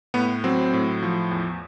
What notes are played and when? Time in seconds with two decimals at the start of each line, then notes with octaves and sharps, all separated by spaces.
0.14 A2 B3
0.44 F#3 C4
0.73 A2
1.03 F3
1.31 E2